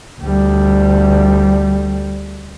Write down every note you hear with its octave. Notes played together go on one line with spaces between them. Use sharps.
D2 G3